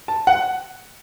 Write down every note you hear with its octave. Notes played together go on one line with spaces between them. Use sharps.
A5
F#5